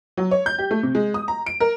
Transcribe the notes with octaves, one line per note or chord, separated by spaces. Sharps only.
F#3
C#5
G6
G4
A3
C3
G#3
D#6
A#5
D7
A#4